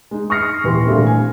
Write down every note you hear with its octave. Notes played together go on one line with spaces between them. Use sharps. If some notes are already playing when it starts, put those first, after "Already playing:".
G#3 D#4
C#6 D#6 F6 A#6 C7 C#7
D#1 E3 G4 C6
A#2 D3 G3 A3 C4
G#5